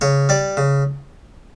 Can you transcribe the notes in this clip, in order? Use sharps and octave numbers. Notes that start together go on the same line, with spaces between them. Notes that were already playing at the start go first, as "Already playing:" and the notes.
C#3 C#5
G3 D5
C#3